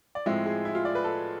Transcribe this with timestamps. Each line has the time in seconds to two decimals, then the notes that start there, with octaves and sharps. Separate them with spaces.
0.15 D5
0.26 A2 F3 G#3 C4 E5
0.46 G#4
0.65 E4
0.75 F4
0.85 D5
0.95 B4
1.04 A4